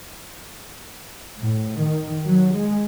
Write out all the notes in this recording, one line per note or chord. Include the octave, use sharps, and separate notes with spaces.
A2
D#3
F#3
G#3